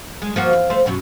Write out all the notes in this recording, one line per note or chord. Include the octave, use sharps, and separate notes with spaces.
G#3
F3 A#3 F#4
E2
A3 C5
F#2 B2 F#3